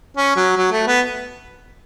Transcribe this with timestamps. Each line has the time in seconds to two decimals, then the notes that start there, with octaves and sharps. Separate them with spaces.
0.17 C#4
0.36 F#3
0.57 F#3
0.71 A3
0.87 B3